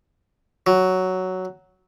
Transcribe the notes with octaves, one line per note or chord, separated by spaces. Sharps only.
F#3